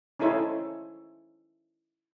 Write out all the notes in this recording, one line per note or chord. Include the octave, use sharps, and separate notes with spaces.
C#4 D#4 E4 A4 C5 C#5